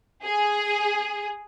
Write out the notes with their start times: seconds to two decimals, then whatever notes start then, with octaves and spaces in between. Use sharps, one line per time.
0.24 G#4